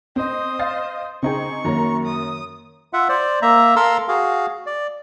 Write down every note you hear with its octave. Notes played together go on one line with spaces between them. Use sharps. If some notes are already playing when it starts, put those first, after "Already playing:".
C4 C5 D#5 D#6
D#5 F5 A6
C#3 C4 D#4 G#4 G5 C#6
F#2 D#3 A#3 C#5 A#5
D#6
F4 E5 F#5
C5 D5
A#3 E5 A#5
A4 A#4 F5 A#5 C6 E6
F#4 G#4 F5
D5